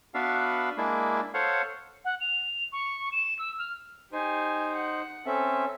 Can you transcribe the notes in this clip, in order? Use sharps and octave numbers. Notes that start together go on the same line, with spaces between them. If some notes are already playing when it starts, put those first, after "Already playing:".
B3 D4 F#4 B4 E5 F5
G#3 A#3 D4 E4
A4 C5 C#5 F5 F#5
F#5
F7
C#6
E7
E6
F6
D#4 G4 C5 G#5
F#5
C4 C#4 A4 E5